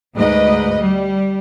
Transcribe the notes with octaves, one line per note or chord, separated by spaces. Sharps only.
D2 G#2 B4 D#5
G3